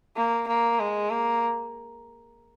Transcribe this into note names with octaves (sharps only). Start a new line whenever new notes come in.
A#3
A#3
G#3
A#3